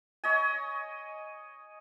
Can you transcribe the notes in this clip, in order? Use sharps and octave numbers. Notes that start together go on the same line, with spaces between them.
C#5 D#5 G#5